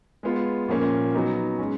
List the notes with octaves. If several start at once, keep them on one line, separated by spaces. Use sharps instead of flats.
G#3 B3 F4
A#2 F3 A#3 C#4
F#3 B3 D#4
G#3 C#4